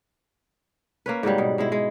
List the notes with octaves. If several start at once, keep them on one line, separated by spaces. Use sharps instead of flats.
A#3 C#4 B4
G#2 C#3 F#3 G3
B2
B2 G#3 E4
G#3